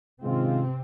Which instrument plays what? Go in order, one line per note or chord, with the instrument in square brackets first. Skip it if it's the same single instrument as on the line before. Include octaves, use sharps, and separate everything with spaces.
[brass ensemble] G#2 D#3 G#3 C#4 F4 [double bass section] C3 C4